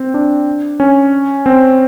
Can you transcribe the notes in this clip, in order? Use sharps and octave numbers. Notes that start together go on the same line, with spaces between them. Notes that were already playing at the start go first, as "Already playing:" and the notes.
Already playing: C4
D4
C#4
C4